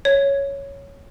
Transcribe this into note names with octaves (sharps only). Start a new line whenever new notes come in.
C#5